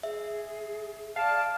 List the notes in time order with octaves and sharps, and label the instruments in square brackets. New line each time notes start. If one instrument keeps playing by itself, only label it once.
[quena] G#4 [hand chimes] E5
[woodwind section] D5 A5 [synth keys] F5 [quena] F6